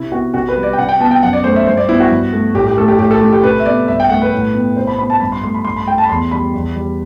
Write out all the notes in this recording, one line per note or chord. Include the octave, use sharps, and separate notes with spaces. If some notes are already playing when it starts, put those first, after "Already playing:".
Already playing: C3 E4
B3 F#4
C3 F#4
B4
G3
D5
G5
C3 F#5
G5
B3 A5
G5
F#2 F#5
D5
A3 C5
E5
G2 C5
D5
B3 E4
F#4
G2
A3
A2 G4
G4
A3 A4
G4
A2 G4
A4
A3 G4
G4
C3 B4
E5
B3 D5
G2 E5
G5
A3 F#5
B4
A2
B3
C3 C5
B5
B3 B5
A5
G2 B5
C6
A3 C6
B5
G2 C6
B5
A3 G5
A5
B5
E2 C6
G3 B5
E2
G3